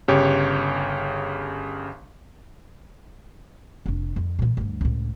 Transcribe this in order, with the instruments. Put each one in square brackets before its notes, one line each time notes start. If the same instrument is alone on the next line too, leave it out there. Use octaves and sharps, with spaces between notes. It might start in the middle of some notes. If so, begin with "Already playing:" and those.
[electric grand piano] G1 C#3 G4 C#5
[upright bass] F1 D4
F2
A#2 E3
D2 G2
C#2 A2